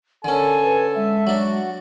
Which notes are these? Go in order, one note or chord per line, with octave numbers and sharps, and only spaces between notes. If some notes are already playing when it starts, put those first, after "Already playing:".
D3 C#4 A4 A#4 G#5
B4
G#3 E5
F#3 D4 F#4